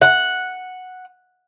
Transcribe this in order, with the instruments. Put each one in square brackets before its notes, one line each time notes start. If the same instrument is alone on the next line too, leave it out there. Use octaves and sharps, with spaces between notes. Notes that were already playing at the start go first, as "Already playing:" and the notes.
[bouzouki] F#5